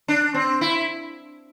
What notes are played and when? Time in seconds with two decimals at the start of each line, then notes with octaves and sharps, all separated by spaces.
0.08 D4
0.34 C4
0.61 E4